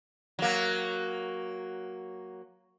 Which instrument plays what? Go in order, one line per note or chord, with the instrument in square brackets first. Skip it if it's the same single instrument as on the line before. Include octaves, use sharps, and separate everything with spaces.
[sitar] F#3 A#3